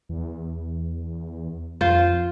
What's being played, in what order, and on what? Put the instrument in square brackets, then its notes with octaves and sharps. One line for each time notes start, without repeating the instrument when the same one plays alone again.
[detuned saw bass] E2
[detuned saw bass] F2 [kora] F4 C5